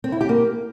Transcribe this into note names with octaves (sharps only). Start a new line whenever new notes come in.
C4
E4
G4
A#3